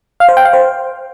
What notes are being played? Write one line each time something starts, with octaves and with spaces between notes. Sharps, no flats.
F5
C5
G5
F5
C5